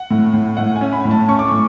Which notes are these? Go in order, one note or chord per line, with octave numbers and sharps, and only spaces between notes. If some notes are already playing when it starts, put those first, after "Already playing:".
Already playing: F#5
A2
A2
A2 F#5
G#5
C#4
B5
A2
A5
C#4 C#6
D6
A2 C#6